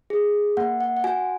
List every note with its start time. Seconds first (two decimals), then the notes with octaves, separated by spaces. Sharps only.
0.10 G#4
0.57 A#3 F#5
0.81 F#5
0.97 F#5
1.04 F#4 G#5